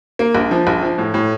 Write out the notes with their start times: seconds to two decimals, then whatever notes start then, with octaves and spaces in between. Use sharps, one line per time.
0.19 A#3
0.35 A#1
0.51 F3
0.67 A#1
0.82 F3
0.98 A2
1.14 A2